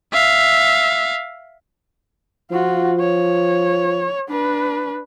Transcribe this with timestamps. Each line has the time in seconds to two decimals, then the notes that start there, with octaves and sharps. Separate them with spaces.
0.13 E5 F5
2.51 F3 F4 F#4
3.00 C#5
4.29 D4 B4